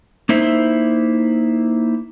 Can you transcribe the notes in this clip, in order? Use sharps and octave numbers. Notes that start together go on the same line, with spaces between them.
A#3 D#4 E4 C5 E5